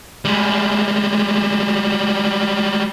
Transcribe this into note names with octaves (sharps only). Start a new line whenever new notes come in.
G3 G#3